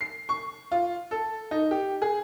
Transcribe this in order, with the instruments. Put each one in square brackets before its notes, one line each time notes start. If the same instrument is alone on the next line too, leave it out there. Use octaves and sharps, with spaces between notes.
[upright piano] C7
C#6
F4
A4
D#4
G4
G#4